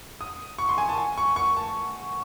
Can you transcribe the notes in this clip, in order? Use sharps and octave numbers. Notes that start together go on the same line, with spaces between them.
D#6
C#6
C6
G#5
A5
G#5
C#6
C#6
A5